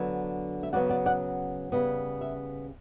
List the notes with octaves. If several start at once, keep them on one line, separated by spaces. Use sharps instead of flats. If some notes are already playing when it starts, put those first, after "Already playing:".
Already playing: D3 F#3 B3
E5
C#3 F#3 B3 D5 F#5
D5 F#5
D5 F#5
C#3 G3 B3
E5